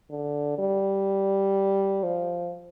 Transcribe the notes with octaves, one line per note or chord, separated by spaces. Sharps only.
D3
G3
F3